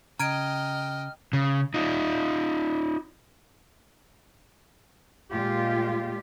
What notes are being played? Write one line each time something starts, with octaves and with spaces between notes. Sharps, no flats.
C#3 D#5 G5 A#5 F6 G#6 D7
C#3
D#4 F4
A#2 G#3 F4 G4